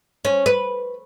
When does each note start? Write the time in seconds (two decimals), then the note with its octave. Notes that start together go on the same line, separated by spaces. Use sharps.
0.25 C#4
0.46 B4